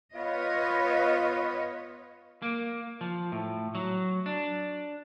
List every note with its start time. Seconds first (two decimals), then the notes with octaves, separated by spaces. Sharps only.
0.14 B3 F4 B4 C#5 D#5
2.42 A#3
3.01 F3
3.32 A2
3.75 F#3
4.26 D4